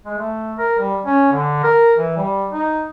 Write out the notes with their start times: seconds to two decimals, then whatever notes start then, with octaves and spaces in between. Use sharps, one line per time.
0.05 G#3
0.18 A3
0.58 A#4
0.79 G3
1.06 C#4
1.32 D3
1.63 A#4
1.97 E3
2.16 G3
2.51 D#4